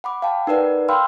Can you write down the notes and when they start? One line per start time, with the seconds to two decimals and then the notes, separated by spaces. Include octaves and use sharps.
0.04 F#5 B5 D6
0.22 F5 G5 A5
0.47 D#4 A#4 B4 D5 F#5
0.89 F5 G5 B5 C6 E6 F6